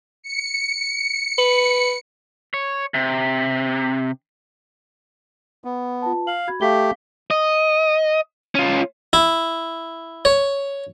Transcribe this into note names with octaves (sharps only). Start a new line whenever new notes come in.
C#7
B4
C#5
C3
B3
F4 B4 A5
F5 F#7
F#4 B5 G#6
A3 G4 F5 B6 G7
D#5
C#4 F4
E4
C#5